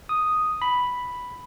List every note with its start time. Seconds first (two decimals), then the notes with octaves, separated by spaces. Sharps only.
0.09 D#6
0.62 B5